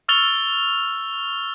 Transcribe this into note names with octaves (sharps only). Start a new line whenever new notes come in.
C#6 E6 F6 A6 F7 G7